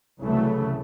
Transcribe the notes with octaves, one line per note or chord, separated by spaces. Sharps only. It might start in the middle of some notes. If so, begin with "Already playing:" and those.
C2 C#3 E3 F#3 A3